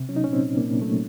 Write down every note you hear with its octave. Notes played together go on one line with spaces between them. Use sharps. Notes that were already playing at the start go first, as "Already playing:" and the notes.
Already playing: C3
F#3 C#4
D#4
A#2 C#4
C4
A#2
A#3
A#2
F#3 A3